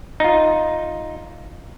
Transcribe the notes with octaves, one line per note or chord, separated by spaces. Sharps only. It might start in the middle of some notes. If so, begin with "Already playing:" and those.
D#4 F4